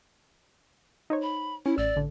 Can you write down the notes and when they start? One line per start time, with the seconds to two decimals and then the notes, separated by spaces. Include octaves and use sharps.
1.10 D#4 C5 C#5
1.22 B5
1.66 C#4 E4
1.78 A1 D5 E6
1.96 A1 D3